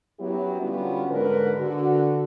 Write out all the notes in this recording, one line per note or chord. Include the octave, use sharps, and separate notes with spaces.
F#2 F#3 B3 E4 G4
D3 G3 B3 C#4 F4 F#4
G#2 D3 G#3 A#4 B4
D3 F#4